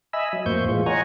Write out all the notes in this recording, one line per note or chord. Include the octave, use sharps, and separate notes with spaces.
D#5 E5 G#5 B5 E6
F#3
F2 A2 A#3 C5 C#6 G6
E3 G#3 F4
C#5 D#5 F#5 G#5 A#5 C#6